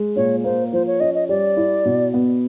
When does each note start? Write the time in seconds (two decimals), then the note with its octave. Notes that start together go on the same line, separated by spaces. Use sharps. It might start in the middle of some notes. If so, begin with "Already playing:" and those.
Already playing: G#3
0.16 A#2 C#5
0.44 A#3 C5
0.73 F3 C5
0.87 C#5
1.00 C#4 D#5
1.15 D#5
1.29 G3 D5
1.57 E4
1.85 B2
2.14 B3